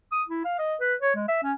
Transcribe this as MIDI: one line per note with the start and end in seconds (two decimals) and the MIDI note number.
0.12 0.23 87
0.28 0.43 64
0.45 0.57 77
0.58 0.75 75
0.80 0.95 71
1.01 1.13 73
1.15 1.26 56
1.28 1.39 76
1.43 1.53 61